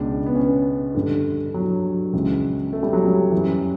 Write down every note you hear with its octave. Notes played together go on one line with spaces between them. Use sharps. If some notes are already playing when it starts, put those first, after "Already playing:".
Already playing: C#2 B2 D4
B3
C#4
G2 D3
F#3
C#2 C#3 E3
A3
G3
F#3
G3
F#2 E3